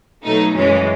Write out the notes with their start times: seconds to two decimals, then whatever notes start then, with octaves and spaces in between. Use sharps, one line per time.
0.24 B2 F#3 A3 D#4
0.55 F#2 E3 G#3 C#4